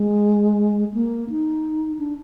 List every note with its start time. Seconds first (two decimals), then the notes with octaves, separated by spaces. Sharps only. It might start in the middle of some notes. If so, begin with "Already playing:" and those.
Already playing: G#3
0.94 A#3
1.30 D#4
1.99 D4